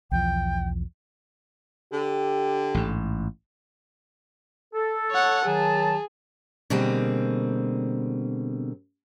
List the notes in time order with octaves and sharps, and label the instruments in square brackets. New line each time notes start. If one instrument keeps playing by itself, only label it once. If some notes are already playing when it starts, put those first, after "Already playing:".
[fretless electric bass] B1 E2 F3 [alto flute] G5
[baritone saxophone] D3 [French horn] G4
[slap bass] A1 G#2
[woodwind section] A4
[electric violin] C#5 F#5
[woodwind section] D#3 F#3 A5 [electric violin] G#4
[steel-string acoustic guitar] B2 D3 G3 A#3 C4 G#4